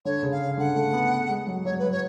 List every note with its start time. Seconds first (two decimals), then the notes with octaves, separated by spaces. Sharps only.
0.05 D3 C#5
0.23 C#3
0.31 F5
0.58 D3 F#5
0.76 A3
0.93 B3
1.29 G#3
1.47 F#3
1.65 F#3 C#5
1.78 B4
1.83 F#3
1.91 C#5